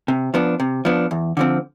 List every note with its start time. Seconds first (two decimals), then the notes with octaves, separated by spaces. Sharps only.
0.08 C3
0.34 F3 B3 D4
0.60 C3
0.85 F3 B3 D4
1.11 E2
1.37 D3 F3 C4